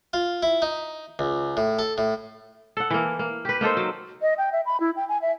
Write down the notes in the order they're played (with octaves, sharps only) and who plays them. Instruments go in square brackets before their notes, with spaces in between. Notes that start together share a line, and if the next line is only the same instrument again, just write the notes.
[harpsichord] F4
E4
D#4
C#2
A2
A4
A2
[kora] A4 F#5
E3 A#3
A#3
G4 B4
A#3 D#4 A4 C5
F#3
[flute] D#5
G5
E5
B5
E4
G5
G#5
E5